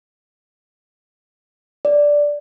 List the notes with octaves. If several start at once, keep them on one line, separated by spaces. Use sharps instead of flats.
D5